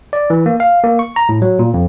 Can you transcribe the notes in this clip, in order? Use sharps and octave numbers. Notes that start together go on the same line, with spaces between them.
D5
E3
A#3
F5
A#3
C#6
A#5
A2
F#3
A#2
F2